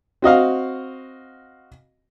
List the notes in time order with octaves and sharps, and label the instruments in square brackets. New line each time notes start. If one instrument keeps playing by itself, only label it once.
[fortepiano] C4 F#4 D#5 F5